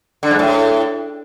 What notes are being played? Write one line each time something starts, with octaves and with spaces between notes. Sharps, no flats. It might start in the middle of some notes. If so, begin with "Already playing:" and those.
D3
G#2
A2